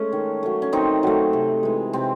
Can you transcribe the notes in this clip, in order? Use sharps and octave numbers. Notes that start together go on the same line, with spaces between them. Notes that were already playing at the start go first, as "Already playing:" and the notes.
Already playing: G#3 A3 C#4
D#3
F#3 A3
C#4
D#3 C4 D#4
F#3 A3
C3
E3 G#3
C3 C4